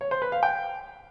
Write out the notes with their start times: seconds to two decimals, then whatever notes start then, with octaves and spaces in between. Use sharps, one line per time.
0.01 C#5
0.11 C5
0.22 B4
0.32 F5
0.43 G5